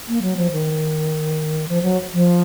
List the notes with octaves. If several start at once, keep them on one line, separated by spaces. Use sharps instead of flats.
A#3
F#3
F3
D#3
F3
F#3
F3